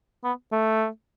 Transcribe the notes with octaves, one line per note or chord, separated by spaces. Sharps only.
B3
A3